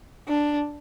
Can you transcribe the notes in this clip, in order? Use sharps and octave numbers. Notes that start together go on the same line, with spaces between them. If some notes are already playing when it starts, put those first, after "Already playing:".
D4